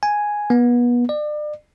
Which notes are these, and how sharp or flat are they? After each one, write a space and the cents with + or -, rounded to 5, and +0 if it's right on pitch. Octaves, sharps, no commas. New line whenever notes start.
G#5 +0
B3 -30
D5 +35